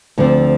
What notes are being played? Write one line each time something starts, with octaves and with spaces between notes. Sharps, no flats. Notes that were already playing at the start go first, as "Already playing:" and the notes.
D2 D3 F3 C4